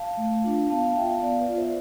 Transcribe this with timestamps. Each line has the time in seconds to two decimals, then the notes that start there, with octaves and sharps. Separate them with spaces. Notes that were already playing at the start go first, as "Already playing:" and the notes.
Already playing: F5 A5
0.17 A3
0.44 D4 F4
0.70 B3 F5 A5
0.83 F5 A5
0.96 F4 E5 G5
1.09 F5 A5
1.21 B3 D5 F5
1.39 B4 D5
1.48 F4
1.57 C5 E5